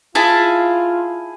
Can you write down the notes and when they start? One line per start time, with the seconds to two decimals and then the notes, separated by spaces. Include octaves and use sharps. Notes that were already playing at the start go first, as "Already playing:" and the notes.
0.15 E4 F4 G#4 A5